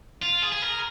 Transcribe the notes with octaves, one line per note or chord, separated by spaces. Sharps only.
F4
G#4
G#4
A#4